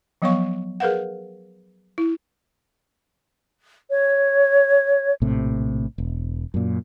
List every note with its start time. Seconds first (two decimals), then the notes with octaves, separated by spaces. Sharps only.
0.22 F3 F#3 B3 C#5 F5 C#6
0.80 G#4 A#4 B4 F5 F#5
1.98 E4
3.90 C#5
5.21 A#1 A2 C3
5.98 E1
6.54 F#2 A#2